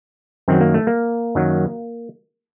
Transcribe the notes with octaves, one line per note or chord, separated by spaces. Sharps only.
F#2 D#3 F#3 C4
A#3
A3
A#3
F#2 D#3 F#3